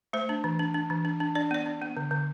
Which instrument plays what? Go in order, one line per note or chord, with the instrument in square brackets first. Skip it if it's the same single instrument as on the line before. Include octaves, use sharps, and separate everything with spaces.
[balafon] A3 C5
D4
E3
D4
D4
E3
D4
D4
D4 D5
B3 D5
D4
B3
D3
D3